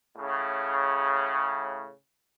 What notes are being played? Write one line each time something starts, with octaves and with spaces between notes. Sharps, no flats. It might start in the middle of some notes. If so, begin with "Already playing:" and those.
A2 C#3